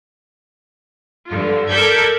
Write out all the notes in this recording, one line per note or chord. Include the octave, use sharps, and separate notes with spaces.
G2 D3 F4
A4 A#4 D5 G6 G#6 B6